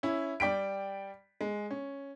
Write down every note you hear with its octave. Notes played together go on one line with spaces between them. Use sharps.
C#4 E4
G3 D5 G5 B6 D7
G#3
C#4